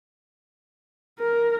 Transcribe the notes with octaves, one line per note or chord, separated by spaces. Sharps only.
A#4